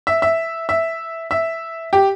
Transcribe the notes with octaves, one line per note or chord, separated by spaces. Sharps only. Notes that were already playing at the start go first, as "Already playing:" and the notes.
E5
E5
E5
E5
G4